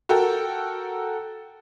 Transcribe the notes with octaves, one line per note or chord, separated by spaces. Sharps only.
F#4 A4 A#4 G5